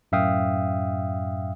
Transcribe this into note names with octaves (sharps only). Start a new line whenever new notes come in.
F#2 A2 E5 F5 G5 D#6